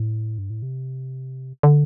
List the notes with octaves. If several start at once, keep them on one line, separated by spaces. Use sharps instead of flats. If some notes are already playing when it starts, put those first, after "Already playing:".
Already playing: A2
G2
A2
C3
D3